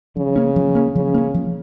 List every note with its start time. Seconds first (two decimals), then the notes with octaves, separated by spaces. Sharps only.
0.17 C#3 F3
0.36 A#3 C#4
0.56 F3
0.75 A#3 C#4
0.95 C#3 F3
1.14 A#3 C#4
1.34 F3